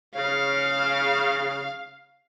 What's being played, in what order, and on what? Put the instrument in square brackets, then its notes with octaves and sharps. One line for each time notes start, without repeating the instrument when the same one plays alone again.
[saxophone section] C#3 [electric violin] F5